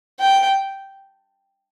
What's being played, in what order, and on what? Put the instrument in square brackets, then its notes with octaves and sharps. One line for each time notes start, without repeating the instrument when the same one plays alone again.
[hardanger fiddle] G5